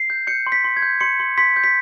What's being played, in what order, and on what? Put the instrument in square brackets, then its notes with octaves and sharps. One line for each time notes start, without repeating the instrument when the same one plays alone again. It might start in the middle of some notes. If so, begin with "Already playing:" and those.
Already playing: [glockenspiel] C7
G6
G6 C#7
C6
B6
C6
G#6
G6
C6 C#7
C6
C6 B6
G6
B6